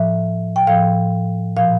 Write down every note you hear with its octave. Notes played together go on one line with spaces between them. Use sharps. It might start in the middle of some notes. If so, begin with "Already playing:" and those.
Already playing: A2 F3 E5
G5
A2 F3 F5
A#2 F3 F5